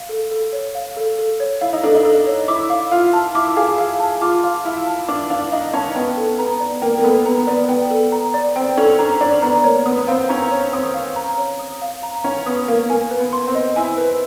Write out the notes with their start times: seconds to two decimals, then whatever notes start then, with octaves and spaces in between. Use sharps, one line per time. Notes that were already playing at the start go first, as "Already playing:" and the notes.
Already playing: F5
0.09 A4
0.31 A4
0.52 C#5
0.75 F5
0.97 A4
1.18 A4
1.40 C#5
1.61 E4 F5
1.73 D#4
1.84 D4 A4
1.95 D#4
2.05 A4
2.27 C#5
2.48 E4 D6
2.70 F5
2.91 F4 F5
3.13 A5
3.35 E4 D6
3.57 G#4 F5
3.78 F5
4.00 A5
4.21 F4 D6
4.44 F5
4.65 E4 F5
4.87 A5
5.08 D4 D6
5.30 D4 F5
5.52 D#4 F5
5.74 C#4 A5
5.95 B3 G5
6.17 A4
6.39 B3 A#5
6.60 D5
6.82 A#3 G5
6.98 A#3
7.04 B3 A4
7.25 B3 A#5
7.47 B3 D5
7.69 B3 G5
7.91 A4
8.12 A#5
8.34 D5
8.56 C4 G5
8.78 C#4 A4
8.99 D4 A#5
9.21 D4 D5
9.42 B3 A#5
9.64 A#3 C#5
9.86 B3 D#6
9.97 B3
10.07 C4 F5
10.29 C#4 A#5
10.51 C#5
10.73 C4 D#6
10.94 F5
11.16 A#5
11.38 C#5
11.59 D#6
11.82 F5
12.03 A#5
12.24 C#4 C#5
12.46 B3 D#6
12.68 A#3 F5
12.90 A#3 G#5
13.11 B4
13.19 B3
13.33 C6
13.47 C4
13.55 D#5
13.76 E4 G#5
13.98 B4